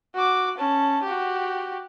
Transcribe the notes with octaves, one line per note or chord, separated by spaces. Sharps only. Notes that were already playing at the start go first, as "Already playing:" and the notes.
F#4 D6
C#4 A5
F#4 G4